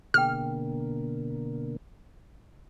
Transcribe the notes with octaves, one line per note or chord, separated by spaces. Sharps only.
B2 D3 A#3 G#4 G5 F6